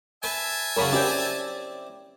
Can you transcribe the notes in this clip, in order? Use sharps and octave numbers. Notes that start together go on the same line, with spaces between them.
B4 E5 G#5 A5
F#2 C#3 F#3 A#4 B5
C4 C#4 E4 G4 D5 G5